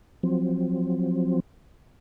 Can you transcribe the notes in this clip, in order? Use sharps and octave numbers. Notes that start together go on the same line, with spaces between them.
F3 F#3 C4